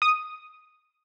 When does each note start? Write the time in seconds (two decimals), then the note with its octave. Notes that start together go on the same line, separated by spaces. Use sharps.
0.02 D#6